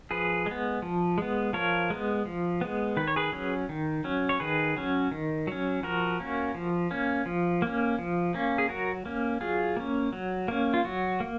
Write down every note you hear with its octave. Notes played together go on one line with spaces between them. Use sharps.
F3 G#4 B4
G#3 B3
F3
G#3 B3
F3 A#4 C#5
G#3 B3
F3
G#3 B3
D#3 B4
C#5
G#4 B4
F#3 C#4
D#3
F#3 C#4
C#5
D#3 G#4 B4
F#3 C#4
D#3
F#3 C#4
F3 F#4 A#4
A#3 C#4
F3
A#3 C#4
F3
A#3 C#4
F3
A#3 C#4
G#4
F#3 F#4 A#4
A#3 C#4
F#3 F4 G#4
A#3 C#4
F#3
A#3 C#4
F4
F#3 F#4
A#3